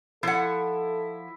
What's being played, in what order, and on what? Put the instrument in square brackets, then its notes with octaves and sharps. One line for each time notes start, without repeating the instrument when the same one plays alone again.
[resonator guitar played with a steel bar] F3 F#5 [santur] E4 [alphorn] A4